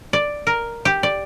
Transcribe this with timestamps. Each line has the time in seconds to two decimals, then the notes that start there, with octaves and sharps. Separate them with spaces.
0.13 D5
0.47 A#4
0.85 G4
1.03 D5